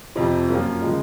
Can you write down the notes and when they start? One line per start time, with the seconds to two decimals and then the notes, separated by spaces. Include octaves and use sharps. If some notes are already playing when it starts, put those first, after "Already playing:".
0.15 F2 C3 F3 C4
0.48 F#2 F3 A#3 C#4 F4
0.81 C#3 F3 G#3